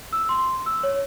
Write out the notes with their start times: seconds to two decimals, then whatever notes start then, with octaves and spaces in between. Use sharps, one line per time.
0.13 E6
0.29 C6
0.66 E6
0.83 C#5